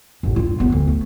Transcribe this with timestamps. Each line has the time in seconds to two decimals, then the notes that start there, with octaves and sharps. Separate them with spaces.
0.23 A1 F#2
0.36 G2 F4
0.60 F#1 B3
0.72 D2
0.88 A3